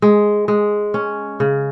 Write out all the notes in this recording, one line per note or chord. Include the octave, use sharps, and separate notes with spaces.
G#3
G#3
C#4
C#3